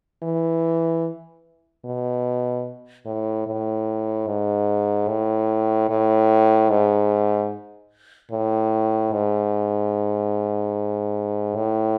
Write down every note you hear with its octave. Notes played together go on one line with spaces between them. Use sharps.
E3
B2
A2
A2
G#2
A2
A2
G#2
A2
G#2
A2